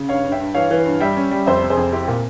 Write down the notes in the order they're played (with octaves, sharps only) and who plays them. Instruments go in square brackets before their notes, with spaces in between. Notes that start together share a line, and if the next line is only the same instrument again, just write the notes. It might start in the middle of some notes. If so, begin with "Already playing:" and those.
Already playing: [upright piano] C#3
G2 C#5 F5
G2
E5 G5
G2
E3 C#5 F5
E3
G2
G3 E5 G5
C#4
G3
F2 C5 E5
C3
G#4 C5
F2
C4 E4 G4
A#2